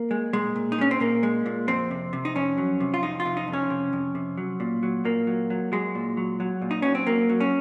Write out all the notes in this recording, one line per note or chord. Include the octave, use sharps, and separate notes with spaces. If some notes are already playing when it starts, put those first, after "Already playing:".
Already playing: A#3
G#3
A#2 G#3
A#2
D#4
G#3 C#4
C4
A#2 A#3
G#3
A#2
F2 C4
C3
C3
D#4
F2 C#4
F#3
C3
F4
F2 D#4
F4
C3
D#4
F2
C#4
C3
F2
C3
F#3
A#2
F#3
A#2 A#3
F#3
F#3
F#3 G#3
A#2
F#3
F#3
A#2
D#4
F#3 C#4
C4
F#3 A#3
F#3
C#4